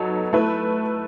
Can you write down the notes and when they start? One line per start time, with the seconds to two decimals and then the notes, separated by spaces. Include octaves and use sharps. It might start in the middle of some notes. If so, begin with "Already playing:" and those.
Already playing: F#3 B3 D#4 A4
0.33 A3 E4 B4